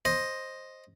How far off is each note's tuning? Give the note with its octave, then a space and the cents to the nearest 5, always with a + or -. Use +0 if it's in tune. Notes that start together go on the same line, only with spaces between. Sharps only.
C5 +10 D#5 +0